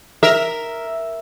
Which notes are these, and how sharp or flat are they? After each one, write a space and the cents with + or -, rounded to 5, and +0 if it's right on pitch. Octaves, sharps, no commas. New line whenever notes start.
A#4 +0 E5 +0